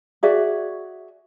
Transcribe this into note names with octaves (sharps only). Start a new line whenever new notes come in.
F#4 G#4 D5 E5